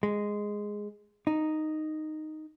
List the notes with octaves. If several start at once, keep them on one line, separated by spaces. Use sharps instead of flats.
G#3
D#4